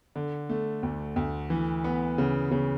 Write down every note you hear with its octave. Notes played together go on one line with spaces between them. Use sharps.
D3
A3
D2
D2
E3
B3
C#3
C#3